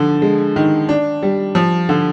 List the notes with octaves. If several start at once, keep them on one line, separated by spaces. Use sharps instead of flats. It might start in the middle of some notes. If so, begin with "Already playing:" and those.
Already playing: D3 F3
G#3
D#3
D4
G3
F3
D3